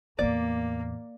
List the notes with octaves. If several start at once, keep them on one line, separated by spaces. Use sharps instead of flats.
E2 A2 A#3 D5